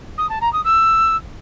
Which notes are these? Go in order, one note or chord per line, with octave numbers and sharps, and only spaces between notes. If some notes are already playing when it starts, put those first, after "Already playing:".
D#6
A5
A#5
D#6
E6